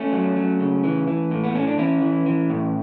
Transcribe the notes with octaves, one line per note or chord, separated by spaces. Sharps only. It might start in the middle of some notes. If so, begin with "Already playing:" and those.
Already playing: A3 C#4
F#3
F#3
C#3
E3
E3
A2
B3
A2 C#4
D4
E3 C#4 E4
E3
E3
A2